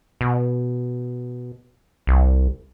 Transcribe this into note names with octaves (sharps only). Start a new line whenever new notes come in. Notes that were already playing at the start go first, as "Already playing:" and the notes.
B2
C2